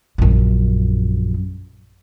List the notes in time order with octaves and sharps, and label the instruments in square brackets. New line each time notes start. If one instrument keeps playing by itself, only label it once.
[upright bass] A#1 F#2